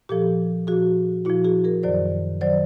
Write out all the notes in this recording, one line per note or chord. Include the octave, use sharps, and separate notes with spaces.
A#2 F3 G4 A4
A#2 F3 F#4 G#4
A#2 F3 E4 F#4
F#4 G#4
G#4 A#4
F#2 D#3 F#3 C5 D5
D#3 F#3 C5 D5